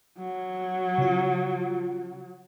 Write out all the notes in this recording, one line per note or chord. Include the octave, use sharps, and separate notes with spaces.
F#3
C#3 F4